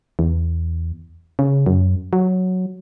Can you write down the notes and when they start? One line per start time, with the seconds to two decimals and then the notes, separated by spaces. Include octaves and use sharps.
0.19 E2
1.39 C#3
1.66 F#2
2.13 F#3